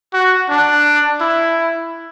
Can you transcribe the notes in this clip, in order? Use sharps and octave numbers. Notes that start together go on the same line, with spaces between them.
F#4
D4
E4